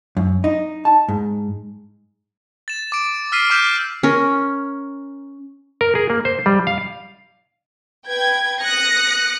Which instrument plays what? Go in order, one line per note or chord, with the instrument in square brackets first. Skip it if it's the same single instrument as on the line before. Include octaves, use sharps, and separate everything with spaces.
[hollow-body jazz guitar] F#2
D#4
A5
G#2
[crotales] A6 E7
D6 D7
E6 F6 B6 C7 D#7
D6 E6 F6 G6 B6 E7
[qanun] C#4 A#4
[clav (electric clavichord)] A#4
G#4
A#3
C5
G3
F5
[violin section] B4 G5 G#6
D#6 F#6 A#6 C#7